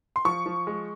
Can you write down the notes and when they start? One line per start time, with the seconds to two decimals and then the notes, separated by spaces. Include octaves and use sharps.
0.16 C6
0.25 F3 C#6
0.46 F3
0.67 G#3